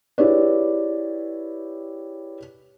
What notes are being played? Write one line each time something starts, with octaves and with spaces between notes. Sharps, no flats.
E4 G4 G#4 B4 C#5 D5